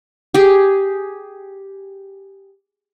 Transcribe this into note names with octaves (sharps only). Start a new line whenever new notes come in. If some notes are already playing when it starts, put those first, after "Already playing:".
G4 G#4